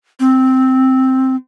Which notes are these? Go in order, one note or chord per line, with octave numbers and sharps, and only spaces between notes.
C4